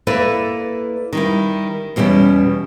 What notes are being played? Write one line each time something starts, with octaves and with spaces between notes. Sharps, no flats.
A#3 E4 A4 B4 D5 E5
D#3 G3 E4
E2 B2 G3 C#4 E4